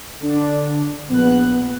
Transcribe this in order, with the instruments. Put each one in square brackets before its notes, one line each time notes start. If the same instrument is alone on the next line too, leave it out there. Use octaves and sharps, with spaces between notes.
[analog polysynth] D3 D4
[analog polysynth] A#1 F#6 [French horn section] B3